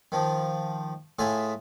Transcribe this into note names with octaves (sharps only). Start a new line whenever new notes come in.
D#3 F3
A2 F4 G#4 E5